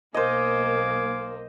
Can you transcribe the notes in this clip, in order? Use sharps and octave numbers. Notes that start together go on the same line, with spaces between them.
B1 A#3 C5 D#5 F5 G#5 D6